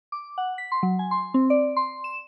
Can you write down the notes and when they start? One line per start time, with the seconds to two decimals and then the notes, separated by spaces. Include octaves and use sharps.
0.12 D6
0.38 F#5
0.58 B6
0.72 C6
0.83 F#3
0.99 G#5
1.11 C6
1.34 C4
1.50 D5
1.77 C6
2.04 E7